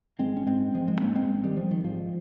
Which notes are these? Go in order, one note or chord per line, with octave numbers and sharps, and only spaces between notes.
G#1 G#3 C4
C#4
G#2 G#3 C4
G#1 F3 G#3
G#3 C4
G#2 A#3 C#4
G#3 C4
G#1
D#3 G3
G#1 F3
D#3
G#2 F3